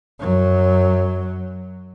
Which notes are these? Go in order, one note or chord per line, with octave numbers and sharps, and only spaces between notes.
F#2 F#3